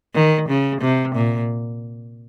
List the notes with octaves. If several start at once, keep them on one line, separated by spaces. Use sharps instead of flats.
D#3
C#3
C3
A#2